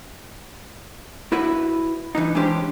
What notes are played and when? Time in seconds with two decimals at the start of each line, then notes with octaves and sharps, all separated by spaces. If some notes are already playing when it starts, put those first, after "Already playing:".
1.32 E4 F#4 B4 E5
2.15 E3 D4 D#4
2.35 E3 G#3 C#4 D4 G4 C5